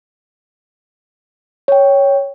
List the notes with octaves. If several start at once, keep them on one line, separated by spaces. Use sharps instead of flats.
C#5 G5